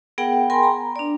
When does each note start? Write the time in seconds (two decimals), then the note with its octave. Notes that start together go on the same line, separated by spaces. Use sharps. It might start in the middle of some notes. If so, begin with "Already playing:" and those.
0.18 B3 G#4 A#4 F#5 G5
0.50 A#4 G5 G#5 B5 C6
0.63 A#5
0.96 D4 D5